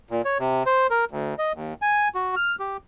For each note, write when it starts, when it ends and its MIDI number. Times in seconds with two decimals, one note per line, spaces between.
0.11 0.22 46
0.25 0.38 73
0.40 0.63 48
0.66 0.87 72
0.90 1.05 70
1.11 1.34 38
1.39 1.52 75
1.55 1.74 39
1.82 2.08 80
2.15 2.35 66
2.36 2.56 89
2.60 2.77 67